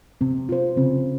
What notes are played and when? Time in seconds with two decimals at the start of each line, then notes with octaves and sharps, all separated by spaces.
0.21 C3 C4
0.49 F4 C5
0.77 C#3 C4